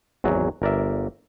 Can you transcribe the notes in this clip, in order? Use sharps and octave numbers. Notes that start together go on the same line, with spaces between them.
G#1 E2 F#3
G1 A#4 D5 E5